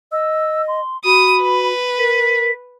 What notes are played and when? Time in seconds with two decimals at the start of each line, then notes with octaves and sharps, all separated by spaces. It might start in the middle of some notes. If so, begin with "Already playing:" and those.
0.12 D#5 E6
0.68 C6
1.05 F#4 B5 D#6
1.43 B4
1.98 A#4 B6